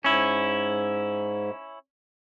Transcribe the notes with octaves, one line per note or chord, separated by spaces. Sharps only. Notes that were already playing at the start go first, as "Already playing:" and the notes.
G#2 C#4 E4